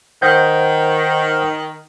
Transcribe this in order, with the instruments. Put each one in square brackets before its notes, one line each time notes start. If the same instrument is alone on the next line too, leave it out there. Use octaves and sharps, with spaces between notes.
[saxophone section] D#3 [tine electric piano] C5 F#5 G6